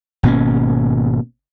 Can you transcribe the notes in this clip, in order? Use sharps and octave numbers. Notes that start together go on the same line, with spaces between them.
G#1 B2 A#3 C#4